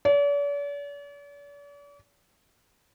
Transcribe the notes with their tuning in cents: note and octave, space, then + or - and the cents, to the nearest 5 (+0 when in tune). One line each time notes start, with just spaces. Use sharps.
D5 -45